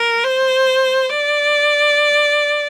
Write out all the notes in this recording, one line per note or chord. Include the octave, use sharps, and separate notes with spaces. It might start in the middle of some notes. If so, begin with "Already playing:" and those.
Already playing: A#4
C5
D5